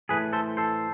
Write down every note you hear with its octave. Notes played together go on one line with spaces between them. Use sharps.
A2 E3 A3 G#4 B4
A4 C5
A4 C5